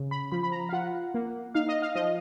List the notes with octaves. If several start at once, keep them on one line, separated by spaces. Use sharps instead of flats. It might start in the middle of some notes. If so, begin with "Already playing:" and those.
Already playing: C#3
B5
F3 B5
B5
A#5
F5
F4 F#5
A#3
D#4 F5
D#5
F5
F3 D#5